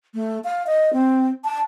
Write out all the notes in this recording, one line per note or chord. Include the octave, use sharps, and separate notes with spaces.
A3
F5
D#5
C4
A5